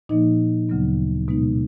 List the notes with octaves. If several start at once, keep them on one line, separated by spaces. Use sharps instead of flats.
A#2 F3 A#3 D#4 D#5
D2 C#3 F#3 B3
B2 G#3 B3 D#4